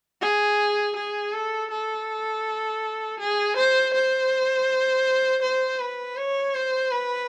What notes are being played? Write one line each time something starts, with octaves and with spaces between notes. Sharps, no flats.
G#4
G#4
A4
A4
G#4
C5
C5
C5
B4
C#5
C5
B4